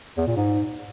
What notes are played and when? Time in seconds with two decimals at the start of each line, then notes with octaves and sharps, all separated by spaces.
0.17 E2
0.27 A#2
0.36 G#2